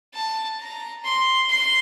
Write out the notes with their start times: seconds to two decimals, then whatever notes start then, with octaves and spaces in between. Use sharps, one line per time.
0.14 A5
0.60 A#5
1.04 C6
1.50 C6